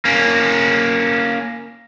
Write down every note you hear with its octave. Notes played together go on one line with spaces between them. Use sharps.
A#3 C#4